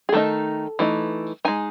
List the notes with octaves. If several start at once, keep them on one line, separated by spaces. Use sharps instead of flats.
G#4
D#3 A3 D#4 A4
E3 A3 D#4
G#3 D#4 G#5